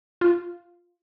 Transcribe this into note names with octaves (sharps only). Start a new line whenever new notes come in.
F4